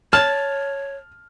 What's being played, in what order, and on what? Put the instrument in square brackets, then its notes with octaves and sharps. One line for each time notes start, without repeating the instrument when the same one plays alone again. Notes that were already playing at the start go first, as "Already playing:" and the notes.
[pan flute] C#5 [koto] A5 [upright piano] F6